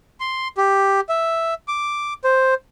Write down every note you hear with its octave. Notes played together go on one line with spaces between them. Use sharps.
C6
G4
E5
D6
C5